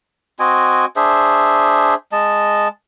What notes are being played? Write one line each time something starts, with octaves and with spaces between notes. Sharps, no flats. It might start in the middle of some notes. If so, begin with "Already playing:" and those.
C4 F#4 D#5 G#5
D4 G#4 C5 E5
G#3 D#5 A5